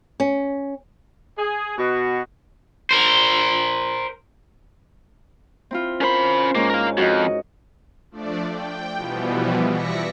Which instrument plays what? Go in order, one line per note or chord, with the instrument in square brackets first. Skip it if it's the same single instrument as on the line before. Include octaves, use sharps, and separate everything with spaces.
[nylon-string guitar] C#4
[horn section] G#4
B2 F#4
[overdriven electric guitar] A#4 C5
[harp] C4 E4 F4
[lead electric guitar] C#4 B5 [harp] A#4 C5
[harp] G#2 C#4 [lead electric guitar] A#3
[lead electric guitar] A#4 F5
[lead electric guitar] F2 [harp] F#4 D#5
[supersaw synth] F3 A3 D4 D5
G5
B2 E3 F3 G3 B3
D5 E5 A#6 B6 C#7